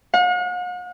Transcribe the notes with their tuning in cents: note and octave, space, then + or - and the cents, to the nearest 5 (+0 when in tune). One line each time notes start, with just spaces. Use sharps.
F#5 -45